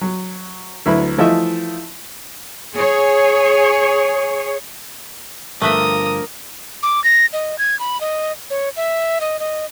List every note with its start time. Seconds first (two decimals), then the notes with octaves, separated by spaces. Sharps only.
0.01 F#3
0.86 D2 F#3 E4 B4 B5
1.18 E3 F3 A3 F4 D#5 E5
2.75 G#4 C#5
5.62 G2 D3 F3 A3 A#4 B4 E5 D#6
6.83 D6
7.04 A#6
7.33 D#5
7.59 G#6
7.80 B5
8.01 D#5
8.50 C#5
8.77 E5
9.21 D#5
9.40 D#5